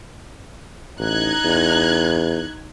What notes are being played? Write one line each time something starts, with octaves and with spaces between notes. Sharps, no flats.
A1 D#4 F#6 G#6
E2